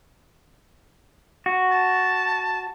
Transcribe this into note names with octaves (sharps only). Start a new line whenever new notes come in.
F#4
A5